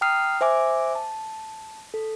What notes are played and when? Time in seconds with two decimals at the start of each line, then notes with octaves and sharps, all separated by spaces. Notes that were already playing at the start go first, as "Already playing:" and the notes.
0.01 G5 A#5 D#6 F6 C7
0.41 C5 E5 G#5 D6
0.95 A5
1.94 A4